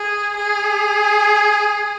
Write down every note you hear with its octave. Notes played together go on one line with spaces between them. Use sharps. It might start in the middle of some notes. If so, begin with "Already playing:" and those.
Already playing: G#4
G#4